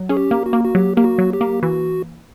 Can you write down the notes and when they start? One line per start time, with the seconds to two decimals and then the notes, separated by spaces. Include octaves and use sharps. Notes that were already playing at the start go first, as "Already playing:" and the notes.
Already playing: F#3
0.09 C#4 G#4
0.17 G4
0.31 A#3
0.46 F#4
0.53 A#3
0.65 F#4
0.75 F#3 G4
0.97 A#3 G4
1.04 F#4
1.18 F#3
1.33 G4
1.41 A#3
1.63 E3 F#4